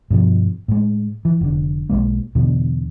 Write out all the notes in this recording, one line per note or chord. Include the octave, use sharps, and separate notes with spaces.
G2 B2 F3
A2 G#3
E3
F1 D3
B1 F#2 G#3 A#3
E2 B2 D3